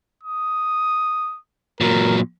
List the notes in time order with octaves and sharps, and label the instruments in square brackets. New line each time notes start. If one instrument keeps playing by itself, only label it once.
[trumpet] D#6
[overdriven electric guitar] A#2 F#3 [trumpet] A#4